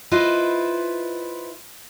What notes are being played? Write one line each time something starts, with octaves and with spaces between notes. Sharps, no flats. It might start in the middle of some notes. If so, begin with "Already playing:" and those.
E4 F4 B4 C5 D#5 E5